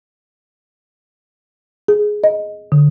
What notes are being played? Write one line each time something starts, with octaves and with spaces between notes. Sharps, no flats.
G#4
D#5
D3